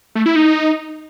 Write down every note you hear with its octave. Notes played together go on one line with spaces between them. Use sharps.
A3
E4
D#4